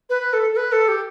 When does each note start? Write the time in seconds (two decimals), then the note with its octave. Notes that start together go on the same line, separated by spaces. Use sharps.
0.10 B4
0.33 A4
0.53 A4
0.57 B4
0.72 A4
0.88 G4